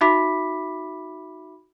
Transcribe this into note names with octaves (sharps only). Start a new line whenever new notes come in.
D#4 F#4 E5 B5 D6 B6